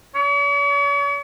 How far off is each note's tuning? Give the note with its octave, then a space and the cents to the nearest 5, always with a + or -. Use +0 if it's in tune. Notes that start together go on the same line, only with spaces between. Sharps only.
C#5 +45